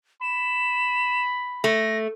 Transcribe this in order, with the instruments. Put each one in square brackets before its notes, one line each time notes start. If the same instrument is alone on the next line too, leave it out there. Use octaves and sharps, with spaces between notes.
[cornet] B5 [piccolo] E7
[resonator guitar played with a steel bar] A3 [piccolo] A#6